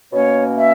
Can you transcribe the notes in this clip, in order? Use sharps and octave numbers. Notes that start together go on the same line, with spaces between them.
B2 A#3 C#4 C#5
E5